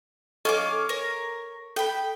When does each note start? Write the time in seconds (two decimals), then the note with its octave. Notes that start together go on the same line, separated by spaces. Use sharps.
0.45 C#4 A4 D#5 F5 C#6 D6
0.89 A#4 C#5
1.76 A4 G5 B5